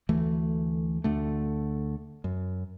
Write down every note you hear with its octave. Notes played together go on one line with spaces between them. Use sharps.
D2 E3 A3
D2 D3 A3
F#2